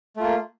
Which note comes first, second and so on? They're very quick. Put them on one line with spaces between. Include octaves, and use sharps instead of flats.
A3 F4 A#3